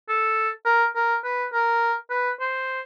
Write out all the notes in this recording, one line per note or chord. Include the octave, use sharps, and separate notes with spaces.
A4
A#4
A#4
B4
A#4
B4
C5